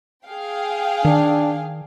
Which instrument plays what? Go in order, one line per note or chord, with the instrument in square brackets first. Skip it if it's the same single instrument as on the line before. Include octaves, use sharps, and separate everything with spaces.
[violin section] G#4 F5 G5
[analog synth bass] D#3 [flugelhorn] D4